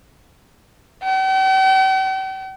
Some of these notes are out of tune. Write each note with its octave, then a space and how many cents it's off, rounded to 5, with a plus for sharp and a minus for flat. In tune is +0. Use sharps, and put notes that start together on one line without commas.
G5 -45